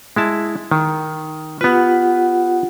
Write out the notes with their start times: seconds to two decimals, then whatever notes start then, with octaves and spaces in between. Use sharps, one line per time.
0.16 G#3 E4 A5
0.71 D#3
1.61 B3 F4 G4 B4 F#5